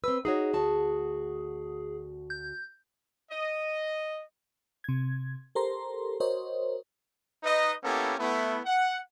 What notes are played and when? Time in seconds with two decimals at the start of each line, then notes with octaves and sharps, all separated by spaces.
0.04 C4 B4 E6
0.25 D#4 F#4 G#4 C#5
0.53 D2 F#4 A5
2.30 G6
3.31 D#5
4.84 C3 G#6
5.55 G4 A4 A#4 C5 A#5 C6
6.20 F#4 A#4 C5 C#5 D#5
7.43 D#4 B4 D#5
7.84 A#3 B3 C#4 E4 G4 A4
8.19 A3 B3 E4
8.66 F#5